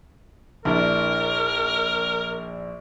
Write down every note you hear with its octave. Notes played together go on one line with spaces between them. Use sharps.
A#1 D4 E4 A#4